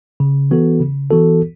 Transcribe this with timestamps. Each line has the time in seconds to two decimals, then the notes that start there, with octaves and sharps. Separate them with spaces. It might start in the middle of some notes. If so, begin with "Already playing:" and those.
0.20 C#3
0.51 E3 B3 F#4 A4
0.80 C#3
1.11 E3 B3 F#4 A4